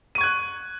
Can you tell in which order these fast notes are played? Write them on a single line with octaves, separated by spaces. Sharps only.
D#7 C#6 G#6 F#6